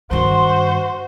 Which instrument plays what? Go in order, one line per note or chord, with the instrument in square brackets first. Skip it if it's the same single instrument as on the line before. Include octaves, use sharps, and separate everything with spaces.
[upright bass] G2 D#3 [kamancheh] F#4 C5 [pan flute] C6